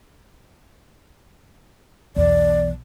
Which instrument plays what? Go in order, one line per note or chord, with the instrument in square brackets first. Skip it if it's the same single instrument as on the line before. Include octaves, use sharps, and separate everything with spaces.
[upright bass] B1 E2 [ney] D5